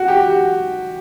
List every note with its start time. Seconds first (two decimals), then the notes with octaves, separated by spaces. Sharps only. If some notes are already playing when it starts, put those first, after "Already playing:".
Already playing: F#4
0.08 G4
0.28 F#4